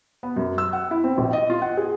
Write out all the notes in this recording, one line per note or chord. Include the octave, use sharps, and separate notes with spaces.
B3
F#2
E6
F#5
E4
C4
A#1
D#5
F4
F#5
G#4